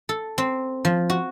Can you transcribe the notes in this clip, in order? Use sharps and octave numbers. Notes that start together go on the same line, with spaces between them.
A4
C4
F3
F#4